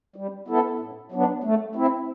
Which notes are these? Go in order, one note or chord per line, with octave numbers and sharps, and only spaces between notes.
G3
B3 E4 A4
A2
F#3 B3 D4
A3
C4 E4